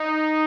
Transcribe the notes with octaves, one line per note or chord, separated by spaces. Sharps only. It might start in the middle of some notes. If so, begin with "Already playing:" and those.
Already playing: D#4